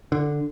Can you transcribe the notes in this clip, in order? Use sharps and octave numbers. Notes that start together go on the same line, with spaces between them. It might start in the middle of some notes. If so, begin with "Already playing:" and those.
D3